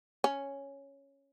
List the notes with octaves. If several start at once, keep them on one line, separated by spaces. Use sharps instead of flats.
C#4